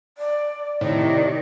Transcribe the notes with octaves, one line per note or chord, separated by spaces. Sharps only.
D5
A2 C3 D#3 D5